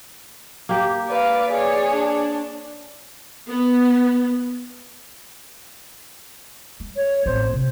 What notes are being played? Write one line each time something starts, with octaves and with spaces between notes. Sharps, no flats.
A#3 G4
B4 D5 F5
G#4 C#5 D5
D4
B3
G#3
C#5
A1 C4 C5
C3